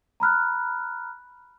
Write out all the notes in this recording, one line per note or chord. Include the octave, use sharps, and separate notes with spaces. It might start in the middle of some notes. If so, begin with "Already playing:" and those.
A#5 B5 F6 F#6